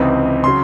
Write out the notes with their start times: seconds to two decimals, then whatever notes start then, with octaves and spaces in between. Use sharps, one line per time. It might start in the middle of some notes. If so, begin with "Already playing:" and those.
Already playing: C#2 C3 E3 C4 D#4
0.44 C#3 F#3 C6